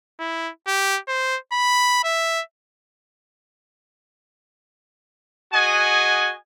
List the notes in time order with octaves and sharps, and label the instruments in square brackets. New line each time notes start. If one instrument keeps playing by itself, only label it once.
[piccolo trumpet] E4
G4
C5
B5
E5
[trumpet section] F#4 G#4 D#5 F#5 G#5